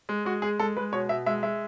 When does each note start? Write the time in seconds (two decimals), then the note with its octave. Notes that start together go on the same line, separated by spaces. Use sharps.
0.09 G#3
0.25 G#3 F#4
0.42 G#3 G#4
0.60 G#3 A4
0.77 G#3 B4
0.92 B2 C#5
1.09 B2 E5
1.26 G#3 E5
1.43 G#3 E5